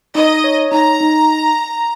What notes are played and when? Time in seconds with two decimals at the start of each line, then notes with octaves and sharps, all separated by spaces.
0.15 D#4 D#5
0.44 C#5
0.72 D#4 A#5
1.01 D#4